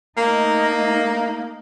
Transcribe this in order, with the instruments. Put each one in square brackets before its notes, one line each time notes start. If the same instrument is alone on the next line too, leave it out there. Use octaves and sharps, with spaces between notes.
[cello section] A3 D#4 [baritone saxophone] A#3